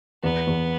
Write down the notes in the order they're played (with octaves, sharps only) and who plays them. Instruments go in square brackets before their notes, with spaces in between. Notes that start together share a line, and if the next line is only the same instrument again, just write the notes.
[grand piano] E2 [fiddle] B3
[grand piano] E2